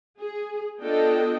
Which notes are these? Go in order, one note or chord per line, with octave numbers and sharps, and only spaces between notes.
G#4
B3 D4 F4 A4 D#5 G5